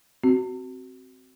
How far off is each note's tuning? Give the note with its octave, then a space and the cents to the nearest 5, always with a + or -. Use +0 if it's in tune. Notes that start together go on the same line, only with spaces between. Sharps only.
C4 +0 F#4 +20